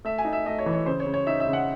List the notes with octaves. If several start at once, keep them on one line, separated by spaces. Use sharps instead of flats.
A3 E5
G#5
D#4
E5
A3 D#5
C#5
E3
C#5
C#3 C5
C#5
C#3
C#5
D#4 E5
E5
C#3
F#5